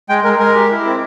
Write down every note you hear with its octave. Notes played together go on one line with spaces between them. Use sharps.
G#3 G5
G#3 A#4
G#3 A#4
G4
E4
C4